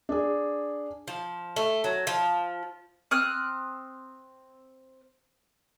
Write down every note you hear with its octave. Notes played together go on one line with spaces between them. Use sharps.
D4 G#4
F3
A3
F#3
F3
C4 D#6 F6 F#6